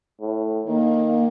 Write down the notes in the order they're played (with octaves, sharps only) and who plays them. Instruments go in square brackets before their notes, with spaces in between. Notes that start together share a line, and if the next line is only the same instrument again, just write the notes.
[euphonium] A2
[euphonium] D#3 [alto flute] A#3